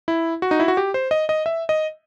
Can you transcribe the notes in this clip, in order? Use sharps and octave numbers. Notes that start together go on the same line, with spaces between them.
E4
F#4
D#4
E4
F#4
G4
C5
D#5
D#5
E5
D#5